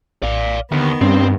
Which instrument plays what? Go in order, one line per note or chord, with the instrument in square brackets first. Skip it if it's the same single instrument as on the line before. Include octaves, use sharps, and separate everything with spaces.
[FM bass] A#1 [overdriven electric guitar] D5 F5
[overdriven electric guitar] D#2 [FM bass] D3 [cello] D#3 B3
[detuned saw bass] G2 [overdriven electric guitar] C4 [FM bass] C#4